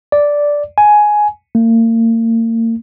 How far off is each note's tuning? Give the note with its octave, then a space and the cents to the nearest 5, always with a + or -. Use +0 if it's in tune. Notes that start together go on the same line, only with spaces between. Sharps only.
D5 -5
G#5 +10
A#3 -40